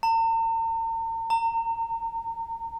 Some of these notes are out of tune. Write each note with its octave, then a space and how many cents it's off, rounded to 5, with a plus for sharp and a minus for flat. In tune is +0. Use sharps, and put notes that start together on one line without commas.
A#5 -45
A#5 -30